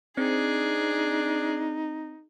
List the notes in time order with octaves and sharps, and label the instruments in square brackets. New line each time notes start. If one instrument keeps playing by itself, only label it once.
[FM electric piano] C4 [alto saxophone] D4 [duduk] D#4 [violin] G#4